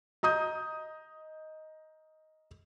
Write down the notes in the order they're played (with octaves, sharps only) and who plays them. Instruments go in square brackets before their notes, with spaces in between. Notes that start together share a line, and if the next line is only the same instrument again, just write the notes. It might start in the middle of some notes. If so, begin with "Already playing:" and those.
[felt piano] D#5 A#5 D#6 G6